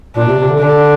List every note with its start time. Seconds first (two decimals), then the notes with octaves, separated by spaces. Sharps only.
0.16 A#2 D4
0.27 C3
0.38 C3
0.49 D3
0.60 D3 D4